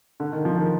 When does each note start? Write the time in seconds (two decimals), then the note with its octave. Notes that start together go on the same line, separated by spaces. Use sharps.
0.20 D3
0.32 D#3
0.45 F3
0.57 D#3